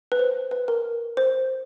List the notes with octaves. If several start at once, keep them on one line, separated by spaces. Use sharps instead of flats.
B4
C5
B4
A#4
C5